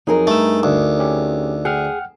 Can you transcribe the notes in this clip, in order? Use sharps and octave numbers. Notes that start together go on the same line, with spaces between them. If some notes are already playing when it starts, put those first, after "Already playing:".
F2 F#3 D#4 G#4 A#4
G2 A3 E6
D2
C#4 G4
G#4 F#5 G5 F6